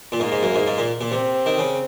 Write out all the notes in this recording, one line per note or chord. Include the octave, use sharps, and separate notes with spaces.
A#2
G#2 A#3
G#2
F#2
G#2
G#2
A#2
A#2
C3 C4
D#3
C#3